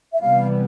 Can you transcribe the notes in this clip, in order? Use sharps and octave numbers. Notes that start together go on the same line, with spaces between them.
E5
C3 E3 G3 B3 F5